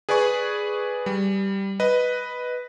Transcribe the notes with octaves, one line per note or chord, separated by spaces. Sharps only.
G#4 B4 D5 G#5 C#6
G3
B4 D#5